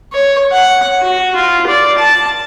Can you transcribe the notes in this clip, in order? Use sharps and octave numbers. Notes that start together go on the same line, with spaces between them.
C#5
F#5
F#4
F4
D5
A5